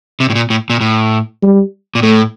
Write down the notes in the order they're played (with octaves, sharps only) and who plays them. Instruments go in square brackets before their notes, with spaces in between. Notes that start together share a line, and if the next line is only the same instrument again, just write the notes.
[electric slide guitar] C3
A2
A#2
A2
A#2
A2
[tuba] G3
[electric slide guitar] A#2
[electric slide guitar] A2 [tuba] A3